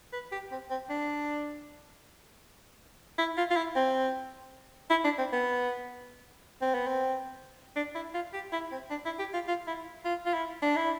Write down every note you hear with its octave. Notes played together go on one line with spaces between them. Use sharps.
B4
G4
C4
C4
D4
E4
F4
F4
E4
C4
E4
D4
C4
B3
C4
B3
C4
D4
E4
F4
G4
E4
C4
D4
E4
G4
F4
F4
E4
F4
F4
E4
D4
E4